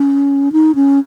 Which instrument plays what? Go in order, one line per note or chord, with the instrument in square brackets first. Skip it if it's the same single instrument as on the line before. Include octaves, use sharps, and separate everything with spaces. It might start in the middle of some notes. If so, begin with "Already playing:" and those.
Already playing: [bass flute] C#4
D#4
C#4